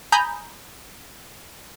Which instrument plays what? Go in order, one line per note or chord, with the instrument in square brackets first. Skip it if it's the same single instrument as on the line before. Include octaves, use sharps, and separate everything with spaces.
[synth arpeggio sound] G#5 A#5 B5 D#6 G6